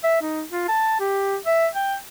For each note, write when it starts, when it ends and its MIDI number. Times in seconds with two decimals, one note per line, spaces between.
0.04 0.21 76
0.22 0.43 63
0.52 0.64 65
0.68 0.95 81
1.00 1.36 67
1.46 1.67 76
1.75 1.96 79